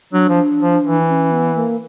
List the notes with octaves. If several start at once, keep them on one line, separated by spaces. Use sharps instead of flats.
F#3 D4
F3
F3
E3
C#4
B3
A#3